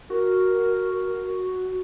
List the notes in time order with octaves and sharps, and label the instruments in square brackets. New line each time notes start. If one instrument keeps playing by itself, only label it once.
[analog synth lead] F#4 [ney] A#4